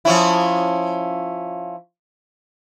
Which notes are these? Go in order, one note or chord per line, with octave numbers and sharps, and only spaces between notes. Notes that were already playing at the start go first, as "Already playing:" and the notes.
F3 C#4 E4